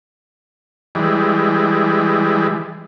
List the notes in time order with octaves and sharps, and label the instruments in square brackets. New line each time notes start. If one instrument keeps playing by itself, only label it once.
[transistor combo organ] E3 G3 G#3